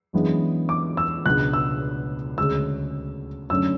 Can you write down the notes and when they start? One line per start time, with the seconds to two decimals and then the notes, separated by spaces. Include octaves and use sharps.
0.13 F#2 E3 G#3 B3 D4
0.69 D6
0.97 E6
1.25 C#2 B2 G#3 B3 D4 F#6
1.53 E6
2.38 D2 C#3 G#3 E6
3.50 F#2 D3 A3 C#4 E6